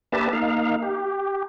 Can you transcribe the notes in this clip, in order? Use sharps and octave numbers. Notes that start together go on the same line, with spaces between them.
A#3 D4 G4 B4 E5 A5
A#3 D#4 F5
G4